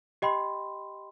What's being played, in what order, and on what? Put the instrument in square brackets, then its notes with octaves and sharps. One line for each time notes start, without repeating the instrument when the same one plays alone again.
[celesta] G4 D#5 G5 B5 C6